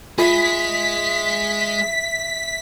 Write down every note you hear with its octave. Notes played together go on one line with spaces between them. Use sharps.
G#3 F4 G#4 E5 B6